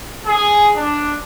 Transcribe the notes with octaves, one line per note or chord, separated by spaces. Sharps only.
G#4
D4